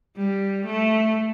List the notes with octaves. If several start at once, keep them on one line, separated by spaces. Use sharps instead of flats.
G3
A3